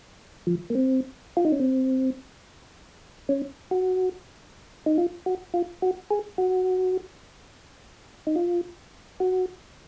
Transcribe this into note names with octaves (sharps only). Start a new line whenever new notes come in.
F3
A#3
C4
F4
D#4
C#4
C4
C#4
F#4
D#4
F4
F#4
F4
F#4
G#4
F#4
D#4
F4
F#4